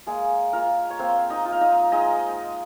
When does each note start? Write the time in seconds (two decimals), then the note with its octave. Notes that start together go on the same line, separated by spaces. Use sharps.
0.06 G#3 A#3 G#4
0.53 A#3 F4 A#4
0.90 C#5
0.99 A#3 C4 C5
1.30 D#4 D#5
1.45 F4
1.52 F5
1.61 D#4 D#5
1.92 G#3 D#4 D#5